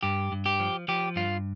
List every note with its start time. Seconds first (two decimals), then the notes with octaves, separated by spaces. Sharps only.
0.03 G2 G4
0.32 G2
0.46 G4
0.60 F3
0.88 F3 G4
1.16 G2 F4